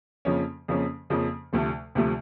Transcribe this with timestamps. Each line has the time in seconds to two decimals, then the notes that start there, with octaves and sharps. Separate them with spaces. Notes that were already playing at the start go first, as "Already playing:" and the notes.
0.25 F2 C#3 F3 A#3 C#4
0.68 F2 C#3 F3 A#3 C#4
1.10 F2 C#3 F3 A#3 C#4
1.53 D2 C3 F3 A3
1.95 D2 C3 F3 A3